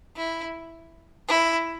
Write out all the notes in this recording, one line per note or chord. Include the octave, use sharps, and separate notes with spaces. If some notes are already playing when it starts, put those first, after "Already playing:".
E4
E4